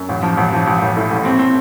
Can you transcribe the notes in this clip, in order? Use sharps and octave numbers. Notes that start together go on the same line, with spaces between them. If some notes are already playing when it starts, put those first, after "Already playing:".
Already playing: F#2
A1
F3
A1
F3
A1
A1
A2
A1
C4
C4